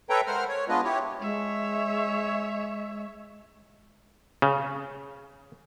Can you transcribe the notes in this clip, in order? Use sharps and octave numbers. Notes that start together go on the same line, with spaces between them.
A4 B4 C#5 E5 G5 A#5
G#3 A#4 C5 F#5 F6
C#5
G#3 B3 D4 F4 B4 D#5
E4 G4 C#5
G#3 C#5 E5
C#3